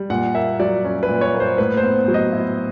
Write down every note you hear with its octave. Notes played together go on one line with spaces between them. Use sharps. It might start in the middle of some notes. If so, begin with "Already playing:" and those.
Already playing: G3
A#2 F#5
A#3 E5
F#3 D5
C#4
B4
A#2
C#5
A#3
C5
A2 B4
C5
B3
F#3
D#5
E4